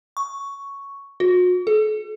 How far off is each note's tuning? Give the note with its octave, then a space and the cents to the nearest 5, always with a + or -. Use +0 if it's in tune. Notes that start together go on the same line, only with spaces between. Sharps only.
C#6 +5
F#4 -40
A4 -45